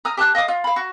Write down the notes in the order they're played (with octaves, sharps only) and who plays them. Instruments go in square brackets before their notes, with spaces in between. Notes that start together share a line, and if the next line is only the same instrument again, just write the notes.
[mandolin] A#5 D#6 F6
G4 A5 D6 F#6
D#5 F5 D6 D#6
F4
F5 B5
F#4